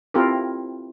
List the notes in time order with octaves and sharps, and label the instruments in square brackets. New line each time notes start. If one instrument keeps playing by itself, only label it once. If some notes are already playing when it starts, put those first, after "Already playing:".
[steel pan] C4 E4 F4 G4 A4 A#4